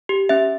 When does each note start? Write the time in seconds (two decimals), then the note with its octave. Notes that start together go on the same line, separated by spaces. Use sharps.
0.09 G4
0.29 C#4 E5